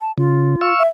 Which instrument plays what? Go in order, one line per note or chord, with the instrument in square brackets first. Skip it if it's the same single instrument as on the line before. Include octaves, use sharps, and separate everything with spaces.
[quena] A5
[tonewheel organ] C#3 [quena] F4
[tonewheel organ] F5 C#6 E6
[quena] E5